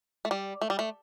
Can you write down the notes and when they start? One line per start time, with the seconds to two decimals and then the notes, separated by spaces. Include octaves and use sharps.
0.25 A3
0.31 G3
0.61 A3
0.70 G3
0.79 A3